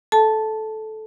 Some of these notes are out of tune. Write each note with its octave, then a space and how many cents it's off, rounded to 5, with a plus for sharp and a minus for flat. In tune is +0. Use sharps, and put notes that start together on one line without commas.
A4 -15 A5 +0